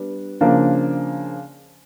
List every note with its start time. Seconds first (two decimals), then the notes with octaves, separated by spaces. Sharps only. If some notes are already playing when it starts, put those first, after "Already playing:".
Already playing: G3 B3 D4
0.41 C#3 F3 A#3 D4